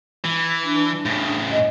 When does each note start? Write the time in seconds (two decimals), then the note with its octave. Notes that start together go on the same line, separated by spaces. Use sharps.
0.25 E3
0.64 D4
1.06 A2 C#3
1.51 D#5